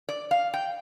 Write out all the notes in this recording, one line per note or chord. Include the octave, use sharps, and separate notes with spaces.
D5
F5
G5